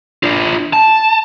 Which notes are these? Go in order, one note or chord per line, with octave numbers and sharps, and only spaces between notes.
D4 F4
A5